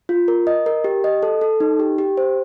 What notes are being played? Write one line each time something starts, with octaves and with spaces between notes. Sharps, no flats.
F4
A#4
D#5
A#4
G4
D#5
A4
A4
D#4
G4
G4
C5